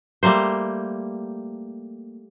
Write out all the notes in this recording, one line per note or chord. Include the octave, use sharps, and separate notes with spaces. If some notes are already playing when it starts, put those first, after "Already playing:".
G3 A3 A#3 C5